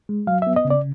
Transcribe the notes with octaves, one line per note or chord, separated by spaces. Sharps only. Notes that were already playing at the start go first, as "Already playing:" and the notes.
G#3
F#3 F5
B3 E5
D#5
C#3
D5